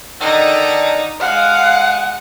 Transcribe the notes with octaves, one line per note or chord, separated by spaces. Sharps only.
D3 D#3 D#4 A4
G#3 F5 F#5